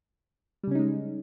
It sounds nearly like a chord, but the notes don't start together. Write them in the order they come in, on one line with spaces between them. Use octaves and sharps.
G3 C#3 C#4 D#4 G#3